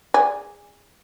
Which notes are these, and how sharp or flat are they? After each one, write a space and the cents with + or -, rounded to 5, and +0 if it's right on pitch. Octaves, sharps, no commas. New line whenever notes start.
G#4 -20 D5 +0